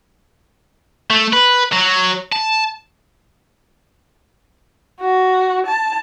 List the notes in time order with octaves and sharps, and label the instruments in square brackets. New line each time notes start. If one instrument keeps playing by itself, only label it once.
[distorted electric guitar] A3
B4
F#3
A5
[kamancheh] F#4
A5